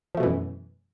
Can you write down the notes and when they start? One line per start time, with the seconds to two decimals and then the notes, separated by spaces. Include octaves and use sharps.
0.15 F3
0.17 A3
0.20 B2
0.23 E3
0.26 F#2